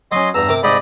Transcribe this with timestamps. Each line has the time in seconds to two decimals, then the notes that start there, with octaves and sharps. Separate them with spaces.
0.12 F#3 C#4 D#5 C6
0.34 E2 G2 A#5 E6
0.48 C3 A#4 D6
0.63 G#2 C3 D#4 D5 D#5 B5